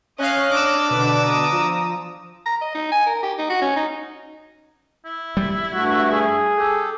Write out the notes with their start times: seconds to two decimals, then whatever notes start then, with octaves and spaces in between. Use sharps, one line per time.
0.18 C#4 C#5 D#5 F5 F6 F#6
0.51 D4 D6 E6
0.91 B2 D3 B4
1.22 A#5 D#6
1.52 F3
2.46 A#5
2.61 D#5
2.74 D#4
2.92 G#5
3.07 A#4
3.23 G4
3.38 D#4
3.50 F#4
3.62 C#4
3.76 D#4
5.05 E4
5.37 G3
5.73 G2 A3 F#4
6.11 G#4
6.57 G4 A4